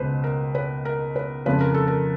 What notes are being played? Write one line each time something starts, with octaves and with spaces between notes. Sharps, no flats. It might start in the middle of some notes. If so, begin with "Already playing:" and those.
Already playing: C#2 B2 B4 C5
A#4
B4
A#4
B4
F2 C#3 F3 B4
A#4
A4
A#4